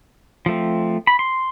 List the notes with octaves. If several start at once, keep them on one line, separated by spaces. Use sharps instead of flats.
F3 A3 C4
B5
C6